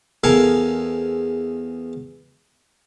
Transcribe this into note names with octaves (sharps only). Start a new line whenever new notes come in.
E2 A4 A#4 F5 G#5